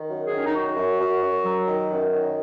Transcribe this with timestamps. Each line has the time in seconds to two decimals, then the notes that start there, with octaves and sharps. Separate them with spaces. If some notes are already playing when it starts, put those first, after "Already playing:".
Already playing: D#3
0.08 F#2
0.24 G#4
0.31 D#3
0.36 C#4
0.45 D#4
0.53 F#2 F#4
0.77 F#2
0.99 F#2
1.21 F#2
1.44 F#3
1.67 D#3
1.90 F#2
2.12 D#3